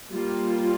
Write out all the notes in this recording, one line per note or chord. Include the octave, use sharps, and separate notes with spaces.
G3 A#3 F4